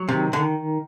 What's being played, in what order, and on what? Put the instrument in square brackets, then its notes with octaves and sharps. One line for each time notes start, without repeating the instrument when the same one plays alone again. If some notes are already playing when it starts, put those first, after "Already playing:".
Already playing: [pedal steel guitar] F#3
[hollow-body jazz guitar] C3 [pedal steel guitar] D#3
[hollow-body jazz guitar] D3 [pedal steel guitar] D#3